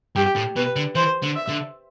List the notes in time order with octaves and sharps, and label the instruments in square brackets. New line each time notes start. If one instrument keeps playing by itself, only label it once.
[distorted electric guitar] G2 [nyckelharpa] G4
[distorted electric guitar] A2
[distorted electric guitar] B2 [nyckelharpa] B4
[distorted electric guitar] D3
[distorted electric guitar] E3 [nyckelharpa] C5
[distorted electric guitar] D3
[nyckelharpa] E5
[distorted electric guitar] D3